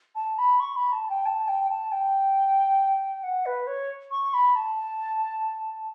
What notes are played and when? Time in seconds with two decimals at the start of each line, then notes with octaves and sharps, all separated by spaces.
0.15 A5
0.38 B5
0.60 C#6
0.76 B5
0.93 A5
1.10 G5
1.26 A5
1.48 G5
1.69 A5
1.92 G5
3.23 F#5
3.46 B4
3.67 C#5
4.11 C#6
4.34 B5
4.56 A5